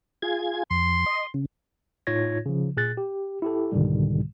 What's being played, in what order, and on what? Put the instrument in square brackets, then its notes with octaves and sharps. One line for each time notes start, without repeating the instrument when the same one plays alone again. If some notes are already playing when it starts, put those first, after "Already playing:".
[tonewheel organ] F4 G#4 G#6
[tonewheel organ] F2 [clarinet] C6
[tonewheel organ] D#5
C#3
[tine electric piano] A2 D#4 F4 C#5 G#6 A#6
C#3 F3
A#2 G#4 F#6 A6
G4
E4 G4 A4
C2 G#2 B2 D3 D#3 G3